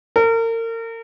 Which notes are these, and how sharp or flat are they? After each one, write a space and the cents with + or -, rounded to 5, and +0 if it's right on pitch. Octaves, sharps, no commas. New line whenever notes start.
A#4 -35